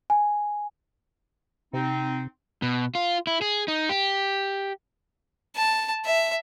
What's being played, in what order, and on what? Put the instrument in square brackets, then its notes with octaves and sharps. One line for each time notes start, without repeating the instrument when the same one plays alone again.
[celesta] G#5
[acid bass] C3 [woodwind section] C4 D#4
[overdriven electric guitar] B2
F4
E4
G#4
D#4
G4
[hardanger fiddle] A5
E5